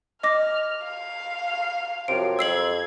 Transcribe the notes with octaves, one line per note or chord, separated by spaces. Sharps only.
D#5 D6 F6 A#6
F5
F#2 C3 F3 D7
F2 E6 G#6 C7 F#7